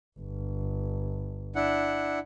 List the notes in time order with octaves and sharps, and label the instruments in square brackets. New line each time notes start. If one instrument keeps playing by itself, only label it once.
[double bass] G1
[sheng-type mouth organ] D4 E4 F#5